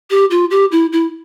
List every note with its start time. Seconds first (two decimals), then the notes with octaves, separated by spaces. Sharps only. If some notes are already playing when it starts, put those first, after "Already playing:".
0.11 G4
0.31 F4
0.51 G4
0.72 E4
0.92 E4